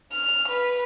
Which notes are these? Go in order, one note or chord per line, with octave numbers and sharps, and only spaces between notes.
F6
B4